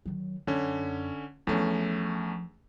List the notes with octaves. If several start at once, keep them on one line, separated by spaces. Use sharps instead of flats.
D#3 F#3
F#2 D3 C#4
E2 F3 A3 C#4 D4